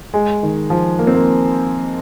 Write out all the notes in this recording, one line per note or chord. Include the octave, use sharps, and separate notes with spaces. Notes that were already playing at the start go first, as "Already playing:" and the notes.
G#3
D#3
F3
A#3
C4
A#3